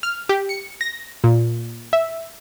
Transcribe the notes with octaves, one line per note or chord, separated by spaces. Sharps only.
F6
G4
C#7
A#6
A#2
E5